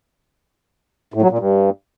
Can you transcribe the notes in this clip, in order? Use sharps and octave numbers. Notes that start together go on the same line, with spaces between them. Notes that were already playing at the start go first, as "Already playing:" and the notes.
A2
F#3
A#2
G2